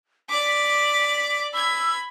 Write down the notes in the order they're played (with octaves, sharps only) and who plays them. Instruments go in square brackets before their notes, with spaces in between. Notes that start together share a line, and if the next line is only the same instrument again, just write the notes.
[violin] D5 D6 [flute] B6
[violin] B5 G#6 [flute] E6